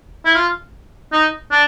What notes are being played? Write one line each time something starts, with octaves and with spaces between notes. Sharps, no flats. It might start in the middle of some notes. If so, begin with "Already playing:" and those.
E4
F4
D#4
D4